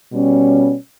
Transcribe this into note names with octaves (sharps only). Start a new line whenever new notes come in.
B2 G3 C#4